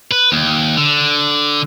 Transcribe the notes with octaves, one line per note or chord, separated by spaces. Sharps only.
B4
D#2
D3